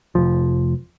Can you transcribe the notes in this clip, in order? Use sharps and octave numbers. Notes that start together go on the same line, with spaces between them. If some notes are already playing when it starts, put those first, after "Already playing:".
F1 F3